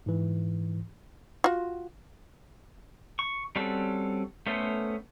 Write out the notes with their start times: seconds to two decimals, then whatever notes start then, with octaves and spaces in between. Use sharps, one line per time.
0.06 G#2 E3
1.44 F4 F#4
3.19 C#6
3.56 G3 C4 C#4 F#4 A4
4.47 A3 B3 C#4 A4 C5